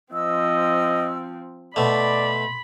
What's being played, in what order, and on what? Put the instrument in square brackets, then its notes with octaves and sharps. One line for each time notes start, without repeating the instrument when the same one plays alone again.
[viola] F3 C4 [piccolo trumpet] D#5 [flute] E6
[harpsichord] B2 A3 [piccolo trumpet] D5 [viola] B5 [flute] C6